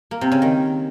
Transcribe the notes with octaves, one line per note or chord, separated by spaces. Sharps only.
A#3
C3
C#3
D#3